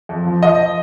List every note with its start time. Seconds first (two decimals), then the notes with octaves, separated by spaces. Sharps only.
0.09 F2
0.26 F3
0.42 F3 D#5